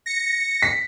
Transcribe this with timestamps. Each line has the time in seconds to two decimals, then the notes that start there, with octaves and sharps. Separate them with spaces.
0.06 A#6 C#7
0.62 B6